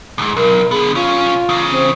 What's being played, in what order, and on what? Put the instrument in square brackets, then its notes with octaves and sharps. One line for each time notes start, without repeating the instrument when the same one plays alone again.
[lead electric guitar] B1 G#2
[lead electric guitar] B1 [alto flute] A#4
[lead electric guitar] D3 B3 [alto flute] G#4
[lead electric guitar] B1 C#4 [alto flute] F4
[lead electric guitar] E2 C#3
[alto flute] C4